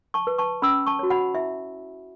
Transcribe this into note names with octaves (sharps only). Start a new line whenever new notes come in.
A5 C#6
B4
A5 C#6
C#4 B5 E6
A5 C#6
F#4 C#5
F#5 B5
E4 E5